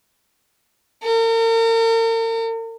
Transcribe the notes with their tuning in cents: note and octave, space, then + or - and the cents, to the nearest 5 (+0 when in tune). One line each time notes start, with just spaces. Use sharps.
A#4 -40